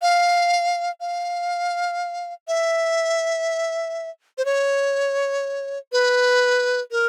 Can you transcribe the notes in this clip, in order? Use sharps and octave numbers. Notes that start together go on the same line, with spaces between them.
F5
F5
E5
C5
C#5
B4
A#4